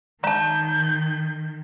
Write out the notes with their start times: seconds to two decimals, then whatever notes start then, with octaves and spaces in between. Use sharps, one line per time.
0.24 D#3 A5 A#5 G6